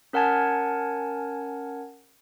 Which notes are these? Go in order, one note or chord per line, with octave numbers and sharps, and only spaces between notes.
C#4 A#4 F#5 G#5 A5 G#6